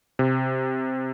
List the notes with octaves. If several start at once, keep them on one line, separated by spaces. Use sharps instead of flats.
C3